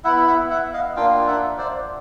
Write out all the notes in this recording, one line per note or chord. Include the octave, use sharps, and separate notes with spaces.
B3 E4 E5 F#5
E5 F#5
E5 F#5
D#5 F5
A#3 D4 F4 F5 G5
E5 F#5
C5 D5